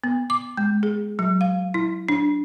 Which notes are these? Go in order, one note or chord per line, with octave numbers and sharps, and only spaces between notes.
B3
D6
G#3
G#4
F#3
F5
E4
D4